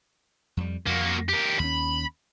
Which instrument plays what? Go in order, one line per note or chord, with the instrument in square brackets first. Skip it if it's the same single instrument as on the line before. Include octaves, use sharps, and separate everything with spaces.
[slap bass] F2 G3
[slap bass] F2 [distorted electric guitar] A#3 F#4
[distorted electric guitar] G4 A#4
[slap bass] D#2 C#4 [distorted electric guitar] B5